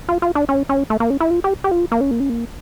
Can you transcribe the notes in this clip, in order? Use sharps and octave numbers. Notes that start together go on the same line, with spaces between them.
F4
F4
D4
C#4
C#4
A3
A#3
C#4
E4
F4
G4
G4
F4
A#3
C#4
A#3
C#4
A#3